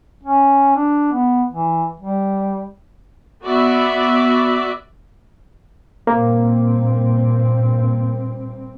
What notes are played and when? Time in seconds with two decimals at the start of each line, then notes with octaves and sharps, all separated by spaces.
0.23 C#4
0.76 D4
1.12 B3
1.49 E3
2.00 G3
3.44 B3 F#4 D5 E5
6.07 G2 A#2 A#3 C4